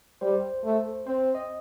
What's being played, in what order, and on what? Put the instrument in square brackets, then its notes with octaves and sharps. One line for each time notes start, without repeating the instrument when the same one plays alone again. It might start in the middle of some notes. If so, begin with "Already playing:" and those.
[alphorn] G3 [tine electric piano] C5
[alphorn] A3
[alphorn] C4 [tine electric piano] C5
[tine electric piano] D#5